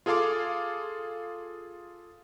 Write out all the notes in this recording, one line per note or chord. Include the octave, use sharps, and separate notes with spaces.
F4 G#4 A4 F5 C6 D6